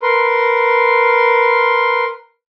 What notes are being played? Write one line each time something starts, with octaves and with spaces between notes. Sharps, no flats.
A#4 B4 C6